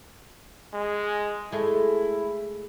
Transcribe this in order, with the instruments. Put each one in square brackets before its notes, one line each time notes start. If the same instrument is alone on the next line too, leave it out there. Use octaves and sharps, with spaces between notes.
[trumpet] G#3
[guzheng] G#3 A3 [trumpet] E4